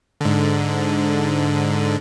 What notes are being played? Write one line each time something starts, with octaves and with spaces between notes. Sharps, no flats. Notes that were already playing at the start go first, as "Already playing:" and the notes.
G#2 D3